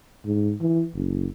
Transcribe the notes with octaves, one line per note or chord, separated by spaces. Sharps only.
G#2
E3
F#1